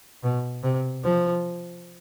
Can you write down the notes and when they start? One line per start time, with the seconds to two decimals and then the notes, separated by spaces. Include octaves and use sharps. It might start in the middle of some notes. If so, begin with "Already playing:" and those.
0.23 B2
0.63 C3
1.04 F3